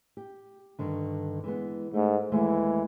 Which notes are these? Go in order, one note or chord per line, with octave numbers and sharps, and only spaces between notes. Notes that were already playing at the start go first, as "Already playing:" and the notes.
G4
G2 D3 D#3
E3 G#3 B3
G#2 A3
D#2 E3 G#3 A3